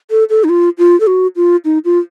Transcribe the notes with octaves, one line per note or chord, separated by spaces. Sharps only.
A4
A4
D#4
F4
F4
A4
F#4
F4
D#4
F4